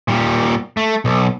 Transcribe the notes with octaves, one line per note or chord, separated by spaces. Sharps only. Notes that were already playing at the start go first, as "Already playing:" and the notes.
A#2 G3
A3
B1